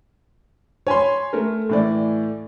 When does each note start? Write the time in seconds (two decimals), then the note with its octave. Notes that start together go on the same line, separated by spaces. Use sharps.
0.87 C#5 G#5 B5 C6
1.33 A3 A#4
1.70 A2 E3 D5